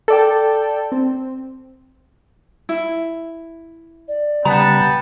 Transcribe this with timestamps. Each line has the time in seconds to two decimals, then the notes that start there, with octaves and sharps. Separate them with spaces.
0.08 A4 D5 G5
0.92 C4
2.69 E4
4.08 D5
4.45 C#3 G3 B3 G5 A5 A#5